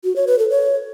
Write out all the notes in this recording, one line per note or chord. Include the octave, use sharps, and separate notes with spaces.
F#4
C#5
B4
A4
C#5